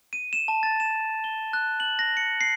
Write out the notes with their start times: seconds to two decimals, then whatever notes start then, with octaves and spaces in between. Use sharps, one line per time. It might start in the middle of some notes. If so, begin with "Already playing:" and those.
0.13 D#7
0.33 E7
0.48 A5
0.63 A6
0.80 E7
1.24 G7
1.53 F#6
1.80 F#7
1.99 A#6
2.17 C#7
2.41 C7